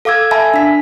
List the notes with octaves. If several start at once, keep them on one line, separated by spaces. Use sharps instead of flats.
A4 F5 D6 E6 G#6
E5 G#5 A5 B5
D4 B6